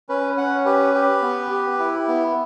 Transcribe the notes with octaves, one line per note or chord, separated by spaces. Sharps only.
C#4 B4
C#4 F#5
G4 B4
G4
B3
G4
E4
B3